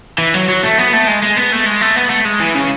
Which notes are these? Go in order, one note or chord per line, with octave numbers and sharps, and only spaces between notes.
E3
F#3
F#3
A3
B3
A3
G#3
G#3
B3
A3
G#3
A3
B3
A3
G#3
E3
C#3